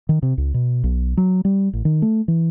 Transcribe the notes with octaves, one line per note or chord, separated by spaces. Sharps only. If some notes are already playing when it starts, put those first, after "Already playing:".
D#3
C3
C#2
B2
B1
F#3
G3
A1
D#3
A3
E3